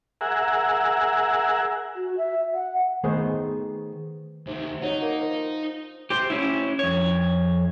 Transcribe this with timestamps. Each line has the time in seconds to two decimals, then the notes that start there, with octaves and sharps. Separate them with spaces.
0.21 G#4 A#4 E5 F#5
1.96 F#4
2.17 E5
2.54 F#5
3.03 D#3 A3 B3 G#4 C5
4.47 D2 C3 D#3
4.82 F#3 D#4
5.02 A#3
5.21 F3
6.10 G4 C5
6.30 C#4 E4
6.79 F2 C#5